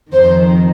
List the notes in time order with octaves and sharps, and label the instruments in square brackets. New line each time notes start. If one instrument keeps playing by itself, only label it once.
[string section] F2 D#3 C5